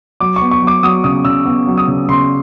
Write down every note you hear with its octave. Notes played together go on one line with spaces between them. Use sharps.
F#3 D6
C#6
B3
C#6
F#3
D6
F#3 D#6
C#3 D#6
C#3 E6
B3
F#3
D#6
C#3
C#3 C6